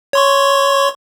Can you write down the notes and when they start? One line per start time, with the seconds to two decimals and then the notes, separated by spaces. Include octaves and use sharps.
0.13 C#5 C6 C#6